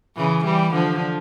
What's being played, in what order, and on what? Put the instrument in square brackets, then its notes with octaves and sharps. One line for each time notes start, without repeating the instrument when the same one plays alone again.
[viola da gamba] C#3 E3
E3 G3
D3 F3